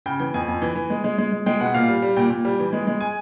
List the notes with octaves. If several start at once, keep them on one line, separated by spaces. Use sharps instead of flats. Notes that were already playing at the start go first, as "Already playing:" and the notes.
C#3 G5
E3 G5
F2 G#5
F2
E3
E3
G#3
G#3
G#3
G#3
G#3 G5
B2 F#5
A#2 F5
G3
G3
A#2 G5
A#2
G3
E3
G#3
G#3
G#5